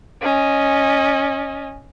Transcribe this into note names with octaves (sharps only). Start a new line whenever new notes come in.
C#4 D#5